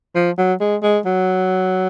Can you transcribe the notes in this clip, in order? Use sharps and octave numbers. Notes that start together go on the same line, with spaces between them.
F3
F#3
G#3
G#3
F#3